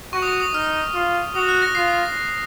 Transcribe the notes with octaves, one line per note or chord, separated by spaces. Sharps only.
F#4 C#6
D#6
C#6
D#6
D#4 F6
F4
F#4 D#6
F#6
A#6
F4 C7
A#6